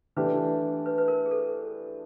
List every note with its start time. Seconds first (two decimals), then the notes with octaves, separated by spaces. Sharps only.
0.16 E3 A3 D4 G4 B4
0.86 B4
0.98 B4
1.08 A#4
1.26 G#4
1.31 A4